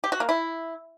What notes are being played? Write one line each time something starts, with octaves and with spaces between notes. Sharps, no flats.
G4
F#4
A#3
E4